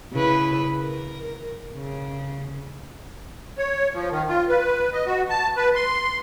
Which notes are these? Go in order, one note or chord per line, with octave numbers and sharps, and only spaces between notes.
C#3 E4 B4
A#4
C#3
C#5
F3
D#3
F4
B4
D#5
F#4
A5
B4
C6